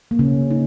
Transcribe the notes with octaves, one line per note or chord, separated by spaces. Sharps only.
A#3
C#3 C#4
D#4